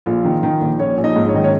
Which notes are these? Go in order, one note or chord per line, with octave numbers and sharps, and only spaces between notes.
A#1 F4
D#3
D#3
A#1
A#1 C#4 C#5
A#1
D#4 D#5
G#2
C#5
D#3 D#5
C#4 C#5